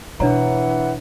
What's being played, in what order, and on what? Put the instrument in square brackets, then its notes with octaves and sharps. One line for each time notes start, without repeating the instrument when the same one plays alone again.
[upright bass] B2 [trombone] E3 [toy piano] D4 C#5 A#5 [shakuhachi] F#5